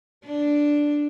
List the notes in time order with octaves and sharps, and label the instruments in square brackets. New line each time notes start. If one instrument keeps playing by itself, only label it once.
[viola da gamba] D4